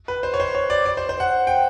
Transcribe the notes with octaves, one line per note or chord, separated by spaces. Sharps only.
B4
C5
C#5
C5
C#5
D5
D5
C5
C5
F#5
G5